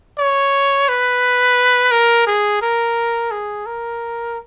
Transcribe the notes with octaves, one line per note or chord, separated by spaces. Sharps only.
C#5
B4
A#4
G#4
A#4
G#4
A#4